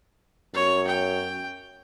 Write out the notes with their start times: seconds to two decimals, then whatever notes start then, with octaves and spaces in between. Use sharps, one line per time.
0.54 F#2 C#5
0.87 G5